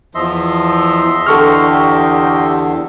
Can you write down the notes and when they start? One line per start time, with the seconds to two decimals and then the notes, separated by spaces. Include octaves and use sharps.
0.15 E2 F3 D#5 E5 C6
1.26 E2 D3 G4 A4 C#6 F6